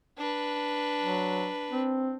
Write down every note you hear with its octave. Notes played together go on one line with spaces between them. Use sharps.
D4 B4
F#3
C4